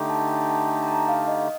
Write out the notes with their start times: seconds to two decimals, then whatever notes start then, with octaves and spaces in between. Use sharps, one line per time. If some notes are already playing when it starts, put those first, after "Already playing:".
Already playing: D3 A3 D#4 G4
0.09 A5
0.29 A5
0.49 A5
0.69 A#5
0.83 A#5
0.88 A5
1.08 F5
1.28 D#5